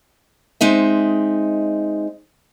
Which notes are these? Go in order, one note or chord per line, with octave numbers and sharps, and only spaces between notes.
G#3 C4 D#4 E5